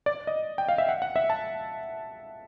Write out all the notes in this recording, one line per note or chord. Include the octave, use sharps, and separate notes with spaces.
D5
D#5
G5
F5
E5
F#5
F#5
E5
A5